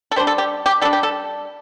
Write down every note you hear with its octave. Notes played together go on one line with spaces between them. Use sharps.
A4
G3 D4 C5
A4
G4
G4
G3 D4 A4
G4
A4